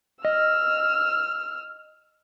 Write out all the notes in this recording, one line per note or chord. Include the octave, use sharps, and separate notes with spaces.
D#5 E6 F6